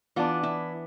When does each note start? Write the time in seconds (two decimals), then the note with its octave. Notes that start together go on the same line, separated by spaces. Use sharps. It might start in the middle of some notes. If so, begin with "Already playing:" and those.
0.16 E3 B3 D4 F4
0.43 E4